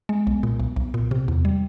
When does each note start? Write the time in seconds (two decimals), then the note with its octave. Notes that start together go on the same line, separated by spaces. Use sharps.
0.09 G#3
0.27 B1
0.43 A#2
0.60 B1
0.76 B1
0.94 A#2
1.11 C3
1.28 E2
1.45 G3